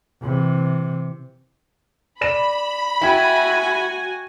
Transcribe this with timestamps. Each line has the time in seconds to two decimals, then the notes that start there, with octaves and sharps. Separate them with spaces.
0.21 C3 E3
2.21 D5 B5 A#6 E7
3.01 E4 F#4 G5 G#5 G#6